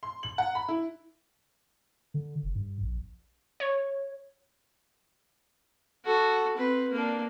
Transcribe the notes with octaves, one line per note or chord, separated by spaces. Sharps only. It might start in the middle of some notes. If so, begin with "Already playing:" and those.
C6
F#7
F#5
B5
E4
D3
F1
G2
A#1
C#5
F#4 A4
C4 B4
A#3 D4